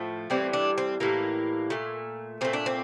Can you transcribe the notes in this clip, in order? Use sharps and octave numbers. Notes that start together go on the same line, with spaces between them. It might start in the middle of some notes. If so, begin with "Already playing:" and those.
Already playing: A2 F3 A3
A2 E3 G3 C4
D4
C4
A2 E3 G3 A#3
A#2 A3
A#2 A3 C4
D4
C4